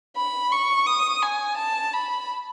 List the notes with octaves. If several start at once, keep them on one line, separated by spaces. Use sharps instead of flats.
B5
C#6
D#6
G#5
A5
B5